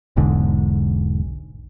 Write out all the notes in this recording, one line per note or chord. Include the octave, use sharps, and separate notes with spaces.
E1 B1 G#2 D3